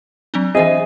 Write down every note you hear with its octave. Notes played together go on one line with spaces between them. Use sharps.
F#3 C4 D4
E3 C4 G#4 D#5 E5 D#7